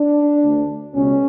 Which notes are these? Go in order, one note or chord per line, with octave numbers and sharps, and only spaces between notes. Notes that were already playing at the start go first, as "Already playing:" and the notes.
Already playing: D4
D2 D3
C#2 B2 C#4